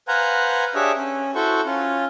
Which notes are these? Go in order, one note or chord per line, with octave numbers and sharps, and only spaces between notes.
B4 C5 F5 F#5 G#5 A#5
D4 G4 G#4 C#5 E5
C#4
E4 F#4 A4 C5 C#6
C#4 F4